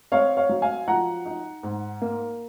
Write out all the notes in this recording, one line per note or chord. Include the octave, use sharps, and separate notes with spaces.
C4 C#5 F5
C#5 F5
F#3
F5 G#5
F3 F#5 A#5
D#4
G#2
A#3